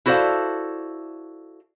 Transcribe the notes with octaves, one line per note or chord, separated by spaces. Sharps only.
E4 F#4 A4 C5 D5 F5